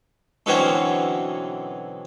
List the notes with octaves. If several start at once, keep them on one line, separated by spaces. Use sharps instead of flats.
B2 D3 E3 F#3 C4 C#4